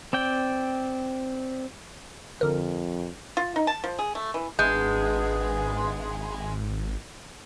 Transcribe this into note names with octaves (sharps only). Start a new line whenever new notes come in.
C4 D5 G5
F2 D3 A#4
F4
D#4
A5
F3
G#4
A3
E3
G#1 G#3 B3 D4 G#4 G6